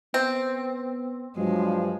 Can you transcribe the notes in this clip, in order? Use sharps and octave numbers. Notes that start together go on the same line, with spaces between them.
B3 C4
G2 F3 F#3 G#3